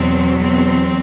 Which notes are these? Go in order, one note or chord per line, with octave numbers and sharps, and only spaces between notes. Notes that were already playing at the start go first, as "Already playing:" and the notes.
Already playing: E2 B2 F#3 C4
C4